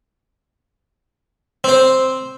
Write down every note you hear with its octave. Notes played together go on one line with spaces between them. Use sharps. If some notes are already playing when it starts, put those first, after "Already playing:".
C4 C5